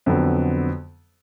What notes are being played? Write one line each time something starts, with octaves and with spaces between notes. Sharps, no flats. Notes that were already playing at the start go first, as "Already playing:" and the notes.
F2 D3 F#3 B3